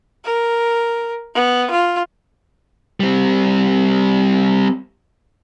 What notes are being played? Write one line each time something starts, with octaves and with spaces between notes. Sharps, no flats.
A#4
B3
F4
G3 C4